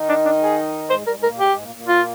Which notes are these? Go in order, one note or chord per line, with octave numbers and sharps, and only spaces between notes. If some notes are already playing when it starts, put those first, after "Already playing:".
Already playing: D#3 D#4
D4
D4
G#4
G#2 G#3 C5
G3 A#4
G#2 G#3
A#4
A#2 A#3
G#2 G#3 G4
G#2 G#3
A#2 A#3
A#2 A#3
F4